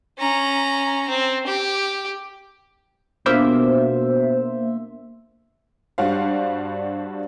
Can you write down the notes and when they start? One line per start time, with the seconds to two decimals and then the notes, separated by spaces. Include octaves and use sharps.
0.18 C#4 A#5
1.09 C4
1.47 G4
3.26 B2 A#3 B3 D4 F4 C5 E5
5.98 G2 G3 D4 F#4 C5 F5